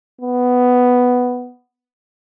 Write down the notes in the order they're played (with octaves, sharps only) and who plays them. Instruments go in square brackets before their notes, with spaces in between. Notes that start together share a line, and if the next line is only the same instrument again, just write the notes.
[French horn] B3